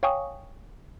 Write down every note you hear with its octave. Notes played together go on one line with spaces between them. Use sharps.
C#5 F5 G5 G#5 C#6 D#6